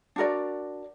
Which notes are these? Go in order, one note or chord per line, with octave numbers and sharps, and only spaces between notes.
D4 F#4 A#4 D5